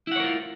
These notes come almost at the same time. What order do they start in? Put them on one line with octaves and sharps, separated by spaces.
E4 F#5 C#5 A#4 F4